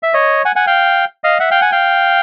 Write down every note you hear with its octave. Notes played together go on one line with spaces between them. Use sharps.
E5
C#5 D#5
F#5 G#5
F#5 G#5
F5 G5
D#5 F5
E5 F#5
F5 G5
F#5 G#5
F5 G5